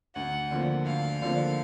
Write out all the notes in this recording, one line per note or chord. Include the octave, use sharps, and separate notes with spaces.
D2 F#5
D3 F3 A#3
D2 F5
D3 F3 A#3